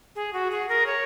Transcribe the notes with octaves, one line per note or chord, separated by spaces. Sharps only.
G#4
F#4
G#4
A#4
C#5